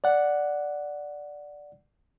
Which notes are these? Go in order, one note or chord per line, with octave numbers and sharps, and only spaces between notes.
D5 F#5